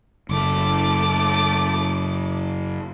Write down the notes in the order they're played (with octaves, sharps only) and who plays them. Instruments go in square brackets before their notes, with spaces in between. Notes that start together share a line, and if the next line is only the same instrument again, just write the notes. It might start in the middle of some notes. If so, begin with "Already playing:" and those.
[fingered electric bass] F#1 [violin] A3 D6